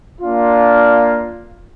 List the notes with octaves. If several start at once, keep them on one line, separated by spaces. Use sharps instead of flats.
A#3 D4 F4